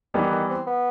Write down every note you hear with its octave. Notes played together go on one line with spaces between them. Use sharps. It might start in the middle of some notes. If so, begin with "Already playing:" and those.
D#3 E3 G3 B3
D#3
C4
B3